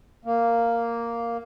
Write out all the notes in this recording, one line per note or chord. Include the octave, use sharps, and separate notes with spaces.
A#3